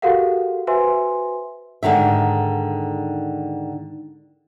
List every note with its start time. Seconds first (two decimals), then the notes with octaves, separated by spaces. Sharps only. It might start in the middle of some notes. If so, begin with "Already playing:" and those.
0.02 F#4 G4 A4 A#4 F5 F#5
0.67 F#4 B4 C5 E5 G#5 C6
1.83 G#2 D3 D#3 E5